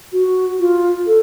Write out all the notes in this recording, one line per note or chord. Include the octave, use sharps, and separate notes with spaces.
F#4
F4
A4